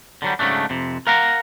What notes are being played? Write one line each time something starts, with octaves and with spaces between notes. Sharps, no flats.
D3 F#3 G3
G#2 C#3 F3 F#3 A3 D4
F2 C3
A#4 F5 F#5 A#5